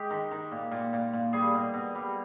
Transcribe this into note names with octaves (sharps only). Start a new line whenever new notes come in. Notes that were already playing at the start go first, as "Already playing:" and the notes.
Already playing: G#3 G4
D#3
D#3
A#2
A#2
A#2
A#2
G3 G#4
B2
B2
G3